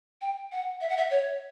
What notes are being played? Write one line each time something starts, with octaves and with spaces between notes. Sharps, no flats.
G5
F#5
E5
F#5
E5
C#5